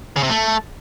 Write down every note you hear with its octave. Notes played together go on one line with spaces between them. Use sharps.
C#3
C3
A3